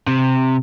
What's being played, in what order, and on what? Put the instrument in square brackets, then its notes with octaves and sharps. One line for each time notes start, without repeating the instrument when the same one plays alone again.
[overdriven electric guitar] C3